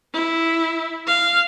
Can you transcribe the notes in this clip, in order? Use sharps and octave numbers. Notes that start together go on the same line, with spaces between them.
E4
F5